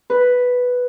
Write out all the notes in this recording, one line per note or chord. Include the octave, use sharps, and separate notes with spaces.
B4